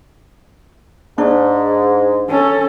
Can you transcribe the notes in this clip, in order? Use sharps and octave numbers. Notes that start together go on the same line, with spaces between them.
G#2 D4
C#4 A4